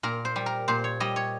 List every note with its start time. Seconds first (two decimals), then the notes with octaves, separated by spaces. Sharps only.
0.03 A#2 A#4
0.25 C5
0.36 G3
0.46 A#4
0.68 A#2 C5
0.84 C#5
1.00 G3 D#5
1.16 C#5